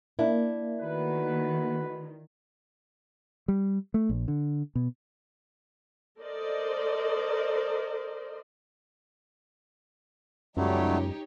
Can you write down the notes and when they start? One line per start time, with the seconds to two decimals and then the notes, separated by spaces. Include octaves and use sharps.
0.19 A#3 D4 E4
0.80 D#3 A3 F#4 B4
3.48 G3
3.94 A3
4.09 A#1
4.28 D3
4.75 B2
6.18 A4 A#4 C5 D5 D#5
10.57 C#2 F#2 F#3 G3 A3 D#4 G4 C#5